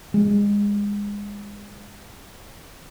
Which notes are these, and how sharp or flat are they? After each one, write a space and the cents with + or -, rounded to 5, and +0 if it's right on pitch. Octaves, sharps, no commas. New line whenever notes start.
G#3 -25